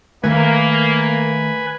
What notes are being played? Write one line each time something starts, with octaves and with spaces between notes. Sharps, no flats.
D#3 A3 A#3 B4 G#5